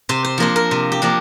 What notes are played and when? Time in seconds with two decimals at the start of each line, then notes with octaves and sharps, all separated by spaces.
0.09 C3 C5
0.24 C5
0.38 F3 A#3 D4 C5
0.56 A#4
0.71 C3
0.92 G4
1.02 F3 A#3 D4